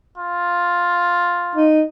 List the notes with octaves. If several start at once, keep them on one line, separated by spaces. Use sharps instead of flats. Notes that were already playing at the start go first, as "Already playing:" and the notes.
F4
D#4